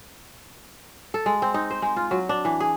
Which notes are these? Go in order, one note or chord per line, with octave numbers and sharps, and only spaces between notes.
A4
G#3
C4
D#4
C5
G#3
F4
F#3
D4
E3
G#4